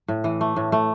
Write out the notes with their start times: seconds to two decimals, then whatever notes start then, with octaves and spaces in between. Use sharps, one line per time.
0.08 A2
0.24 E3
0.41 A3
0.56 A2
0.72 A3